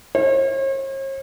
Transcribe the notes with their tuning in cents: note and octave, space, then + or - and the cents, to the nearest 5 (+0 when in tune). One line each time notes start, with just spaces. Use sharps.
C#5 -45